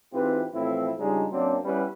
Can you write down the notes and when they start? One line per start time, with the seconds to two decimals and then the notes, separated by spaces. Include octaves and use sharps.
0.13 G#2 E3 C4 F4 G4 B4
0.54 A2 E3 F3 C4 E4
0.99 C#3 F3 G3 G#3 D4 D#4
1.31 F#2 F#3 A#3 C4 D4 C5
1.65 G3 B3 C#4 E4 B4